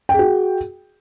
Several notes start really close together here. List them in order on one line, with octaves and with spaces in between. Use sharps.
G5 G#4 F#4